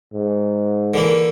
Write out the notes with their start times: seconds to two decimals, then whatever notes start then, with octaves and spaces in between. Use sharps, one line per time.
0.13 G#2
0.94 D3 E3 A#3